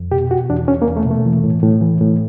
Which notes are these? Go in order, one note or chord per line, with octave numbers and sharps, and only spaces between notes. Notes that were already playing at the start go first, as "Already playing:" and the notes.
Already playing: F2
B2 G4
B2 F#4
E2 D4
E2 C#4
A#3
E2
A3
B2
A3
E3
A2
A2
E3
A2